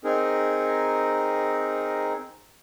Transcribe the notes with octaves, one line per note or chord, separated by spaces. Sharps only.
C4 D#4 G#4 A#4